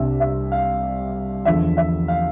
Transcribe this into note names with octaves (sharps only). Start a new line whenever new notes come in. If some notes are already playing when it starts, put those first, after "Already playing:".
Already playing: C2 C3 G3 D4 E5
E5
F5
E2 D3 F3 E5
E5
F5